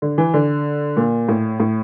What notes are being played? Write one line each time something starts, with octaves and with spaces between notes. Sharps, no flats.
D3
E3
D3
A#2
A2
A2